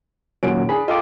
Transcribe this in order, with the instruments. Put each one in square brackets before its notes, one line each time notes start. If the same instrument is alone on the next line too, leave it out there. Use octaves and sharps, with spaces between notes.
[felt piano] D#2 D7 [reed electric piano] A#2 F#3 C#4
[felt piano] D4 G#4 G#5 [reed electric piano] B5
[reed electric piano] F4 A4 D6 [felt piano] D#5 G5